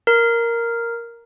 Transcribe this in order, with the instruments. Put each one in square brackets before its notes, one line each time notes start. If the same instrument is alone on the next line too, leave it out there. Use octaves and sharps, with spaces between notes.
[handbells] A#4